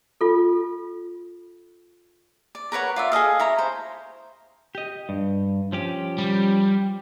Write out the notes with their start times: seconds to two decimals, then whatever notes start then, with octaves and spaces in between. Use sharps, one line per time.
0.21 F4 A4
2.55 D5
2.72 A#4 B4 C#5 F#5
2.96 F4 D5 E5
3.12 G#4 A4 D#5 F5
3.39 E4 C#5 A#5
3.58 C5
4.75 G4 D#5
5.09 G2
5.72 F3 C#4 G4
6.18 G3